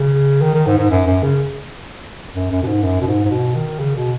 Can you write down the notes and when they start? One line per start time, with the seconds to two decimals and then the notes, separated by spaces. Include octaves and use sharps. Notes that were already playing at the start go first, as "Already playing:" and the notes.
Already playing: C#3
0.42 D#3
0.54 D#3
0.66 G#2
0.78 G#2
0.90 F#2
1.06 F#2
1.23 C#3
2.35 F#2
2.51 F#2
2.63 B2
2.67 G#2
2.83 F#2
3.01 B2
3.07 G#2
3.25 G#2
3.31 B2
3.55 D#3
3.80 C#3
3.96 B2